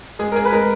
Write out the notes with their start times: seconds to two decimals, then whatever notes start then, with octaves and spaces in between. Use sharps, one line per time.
0.19 G#3 G#4
0.32 A#4
0.36 G#4
0.45 B4
0.52 G#3 A#4